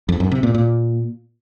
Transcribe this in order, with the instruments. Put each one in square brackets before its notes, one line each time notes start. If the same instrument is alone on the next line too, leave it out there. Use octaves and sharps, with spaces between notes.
[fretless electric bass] F2
F#2
C3
A#2
A#2